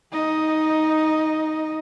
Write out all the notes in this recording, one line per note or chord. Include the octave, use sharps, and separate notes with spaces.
D#4 D#5